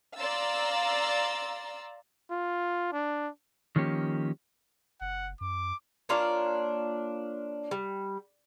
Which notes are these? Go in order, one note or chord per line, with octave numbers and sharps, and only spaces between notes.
D5 F5 A#5 C6 E6 A6
F4
D4
D#3 F3 A#3 C#4 G4
F#1 F#5
F#2 D6
A#3 D4 F4 C#5
G3